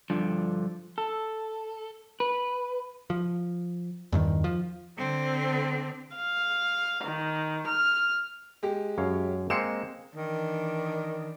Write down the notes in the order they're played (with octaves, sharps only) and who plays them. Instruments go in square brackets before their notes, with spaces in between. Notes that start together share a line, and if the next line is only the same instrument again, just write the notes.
[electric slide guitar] G2 D3 F3
A4
B4
[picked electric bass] F3
E2 G2 D#3
F3
[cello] D3 C4
[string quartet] F5
D#3
F6
[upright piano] G#3 G4
[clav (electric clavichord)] F#2 C#5 F5
[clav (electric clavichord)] G#3 A#3 C4 [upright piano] C7 C#7 E7
[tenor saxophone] D#3 [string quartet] E3 D4